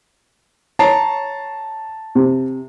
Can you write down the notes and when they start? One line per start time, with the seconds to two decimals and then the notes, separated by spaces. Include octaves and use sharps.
0.79 C#5 A5 A#5 C7
2.15 C3